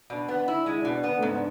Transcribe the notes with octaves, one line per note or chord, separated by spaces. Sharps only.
B2 D4
B3 D4
D4 E4
G#3 E4
B2 D4
D4
B3
D4
A3
G#2 B3
D4